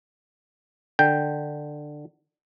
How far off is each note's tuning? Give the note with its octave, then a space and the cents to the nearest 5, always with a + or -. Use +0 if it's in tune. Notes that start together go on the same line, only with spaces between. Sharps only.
D3 +15 G5 +0